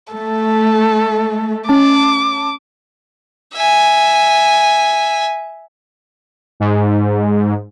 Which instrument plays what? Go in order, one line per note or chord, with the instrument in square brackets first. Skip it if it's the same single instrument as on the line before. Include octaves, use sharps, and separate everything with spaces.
[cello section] A3 [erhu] A4
[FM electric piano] C#4 A5 [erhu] D6
[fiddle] E5 G#5
[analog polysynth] G#2